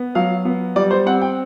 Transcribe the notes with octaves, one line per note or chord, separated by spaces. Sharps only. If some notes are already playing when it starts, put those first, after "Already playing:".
Already playing: B3
F#3 F5
B3
G3 D5
C5
C4 F#5
G5